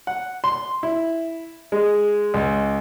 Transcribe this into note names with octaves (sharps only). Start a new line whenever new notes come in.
F#5
C6
E4
G#3
C#2